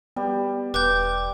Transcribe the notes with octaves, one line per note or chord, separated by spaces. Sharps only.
G3 B3
E1 G4 B4 G6